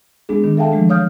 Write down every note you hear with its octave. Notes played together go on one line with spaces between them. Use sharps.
G#3 B3 D4 G#4
D#3 B3 D4
A4 E5 F5 G5 A5
E3 F3 G#3 A3 D4
C#5 F5 D#6 F6 G6